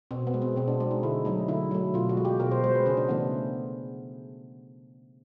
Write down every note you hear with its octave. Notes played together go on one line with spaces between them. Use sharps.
B2 C4
B3
G#3
C4
B2 C4
D4
G#3
D#4
D3 E4
F#3 A3 D#4
D3 E4
F#3 A3
B2 F4
F#4
G#3
G4
B2 A#4
C5
G#3 C5
B4
C#3 G#4
D4
E3 A3 B3